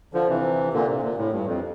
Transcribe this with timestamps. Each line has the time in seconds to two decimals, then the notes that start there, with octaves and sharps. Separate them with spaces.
0.13 D3 F3
0.28 C3 E3
0.73 A#2 D3
0.88 C3
1.02 A#2
1.18 A2
1.32 G2
1.47 F2